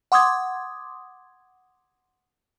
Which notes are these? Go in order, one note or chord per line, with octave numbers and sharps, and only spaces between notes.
F#5 C6 D6 D#6 G#6